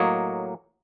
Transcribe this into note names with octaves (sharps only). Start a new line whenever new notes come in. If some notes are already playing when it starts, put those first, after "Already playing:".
Already playing: A2 F#3 A#3 C#5 D#5